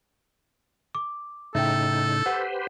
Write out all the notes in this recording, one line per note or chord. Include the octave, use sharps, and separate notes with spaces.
D6
A2 C#3 D#4 A4 E5 G5
G4 B4 C5 F#5